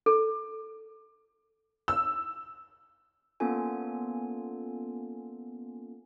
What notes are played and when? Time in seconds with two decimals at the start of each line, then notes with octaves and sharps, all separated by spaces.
0.06 A4
1.88 E6
3.40 A#3 B3 C#4 F4 A4 G#5